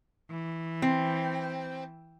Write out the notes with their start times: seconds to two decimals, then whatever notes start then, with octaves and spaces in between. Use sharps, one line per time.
0.30 E3
0.82 C4